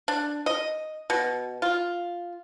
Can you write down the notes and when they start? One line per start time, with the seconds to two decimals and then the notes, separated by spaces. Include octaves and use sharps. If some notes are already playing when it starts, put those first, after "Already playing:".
0.08 D4
0.46 D#5
1.10 B2
1.62 F4